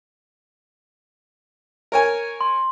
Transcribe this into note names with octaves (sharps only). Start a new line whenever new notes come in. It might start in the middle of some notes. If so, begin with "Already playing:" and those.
A#4 C#5 G#5
C6